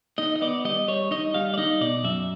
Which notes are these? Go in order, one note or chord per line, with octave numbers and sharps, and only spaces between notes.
D#4 D#5
D#5
B3 D5
G3 D#5
G3 C#5
D#4 D#5
G3 F5
D5
D#4 D#5
B2 D5
F#2 E5